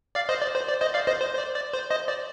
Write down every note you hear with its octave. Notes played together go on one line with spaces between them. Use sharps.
D5 F5
C5 D#5
D5
C5
D5
C5 D#5
D5 F5
C5 D#5
C5
C5
D5
D5
C5
C5 D#5
D5